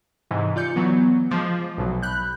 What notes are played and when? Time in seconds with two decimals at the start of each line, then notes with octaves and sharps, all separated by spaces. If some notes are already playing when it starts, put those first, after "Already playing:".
0.31 G#2 C3 E3
0.56 F4 D5 G6 C#7
0.76 E3 F#3 B3
1.31 F3 G#3 D6
1.78 B1 B2 F#3
2.02 B5 F#6 G6